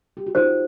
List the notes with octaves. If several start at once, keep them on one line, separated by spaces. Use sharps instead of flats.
G4
F#4
D#4 F4 C5